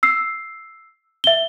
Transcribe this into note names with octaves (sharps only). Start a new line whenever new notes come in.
E6 C7
E5 G7